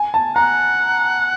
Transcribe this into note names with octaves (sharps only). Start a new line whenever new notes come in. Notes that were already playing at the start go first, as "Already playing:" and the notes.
Already playing: G#5
A5
F#5 A#5